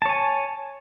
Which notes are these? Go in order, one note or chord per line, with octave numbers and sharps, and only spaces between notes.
C#5 G#5 A5